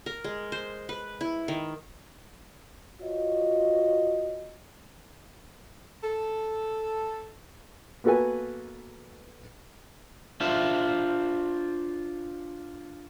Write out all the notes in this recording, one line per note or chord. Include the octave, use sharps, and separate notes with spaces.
A#4
G#3
C5
B4
E4
D#3
F4 F#4 C5 C#5 D#5
A4
A#3 B3 F#4 A4 B4 G#5
D4 F4 C5 E5